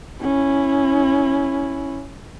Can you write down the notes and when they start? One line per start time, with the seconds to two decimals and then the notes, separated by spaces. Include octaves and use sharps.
0.20 C#4 E4